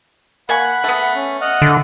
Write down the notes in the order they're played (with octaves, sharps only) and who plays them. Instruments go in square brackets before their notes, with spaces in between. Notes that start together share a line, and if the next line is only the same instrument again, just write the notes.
[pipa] A#3 G#5 C#6 [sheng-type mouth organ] F#5 B5
[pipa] A3 B3
[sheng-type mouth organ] C#4
D#5 F#5 F6
[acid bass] D3